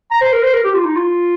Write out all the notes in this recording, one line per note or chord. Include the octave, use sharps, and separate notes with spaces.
A#5
C5
A#4
C5
A#4
G4
F4
D#4
F4